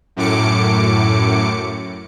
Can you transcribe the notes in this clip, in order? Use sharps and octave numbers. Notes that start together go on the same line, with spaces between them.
F#2 A2 D6 C#7